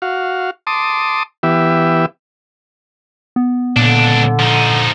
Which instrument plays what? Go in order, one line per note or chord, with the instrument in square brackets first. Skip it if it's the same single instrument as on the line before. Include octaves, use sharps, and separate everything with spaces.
[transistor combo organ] F#4 F5
A5 C6 D6 D#6
E3 B3 G4 E5
[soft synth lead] B3
[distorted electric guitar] C#2 D4 [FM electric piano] A#2 [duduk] D3
[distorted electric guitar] F3 D#4